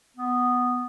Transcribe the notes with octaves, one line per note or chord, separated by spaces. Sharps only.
B3